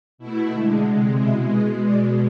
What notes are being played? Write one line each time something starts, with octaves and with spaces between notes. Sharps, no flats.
B2 A3 E4
D3 G#3
C3 G#3
B2 G#3 E4
B2 G#3 G#4
B2 G#3 D5